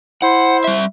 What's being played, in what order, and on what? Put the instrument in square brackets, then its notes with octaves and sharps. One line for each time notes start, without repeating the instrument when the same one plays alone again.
[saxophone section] E4 C5 [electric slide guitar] F#5
[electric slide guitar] G3 E5